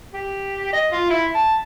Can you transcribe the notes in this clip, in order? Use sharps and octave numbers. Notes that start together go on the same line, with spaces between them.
G4
D#5
F4
E4
A5